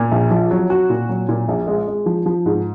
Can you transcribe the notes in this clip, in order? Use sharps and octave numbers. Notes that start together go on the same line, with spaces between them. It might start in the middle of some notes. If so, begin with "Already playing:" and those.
Already playing: A#2
A#1
F3
F#3
F#4
A#2
F#3
A#2
A#1
G#3
G#3
F3
F3
G#2